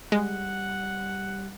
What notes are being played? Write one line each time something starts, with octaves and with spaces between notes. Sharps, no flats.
G3 G#3 F#5